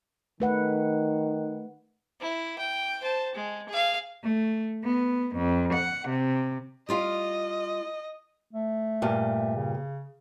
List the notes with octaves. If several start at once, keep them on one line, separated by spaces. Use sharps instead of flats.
D#3 A3 B4 F#5
E4
G5
C5 A5
G#3
G#4 F5
A3
B3
F2
F#5
C3
G3 F4 D#5 F5
A3
G2 A#2
C#3